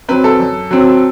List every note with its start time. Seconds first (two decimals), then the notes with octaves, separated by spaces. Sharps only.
0.09 F#3 C4 B4
0.24 A4
0.40 F#2
0.71 F#3 C4